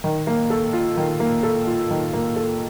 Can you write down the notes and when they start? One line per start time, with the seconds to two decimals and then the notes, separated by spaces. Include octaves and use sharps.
0.04 D#3
0.27 A#3
0.50 A4
0.73 F4
0.97 D#3
1.20 A#3
1.43 A4
1.67 F4
1.91 D#3
2.13 A#3
2.36 A4